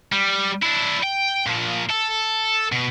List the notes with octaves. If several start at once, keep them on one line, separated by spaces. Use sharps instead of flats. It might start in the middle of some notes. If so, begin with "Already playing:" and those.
G3
D4 E4
G5
A#2 F3
A4
B2